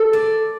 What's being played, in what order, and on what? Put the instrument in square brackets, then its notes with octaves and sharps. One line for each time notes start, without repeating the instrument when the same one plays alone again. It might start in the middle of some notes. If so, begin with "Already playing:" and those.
Already playing: [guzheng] A4
D5